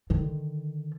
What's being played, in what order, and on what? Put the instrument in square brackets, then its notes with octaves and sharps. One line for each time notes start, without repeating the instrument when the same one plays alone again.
[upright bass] D3 D#3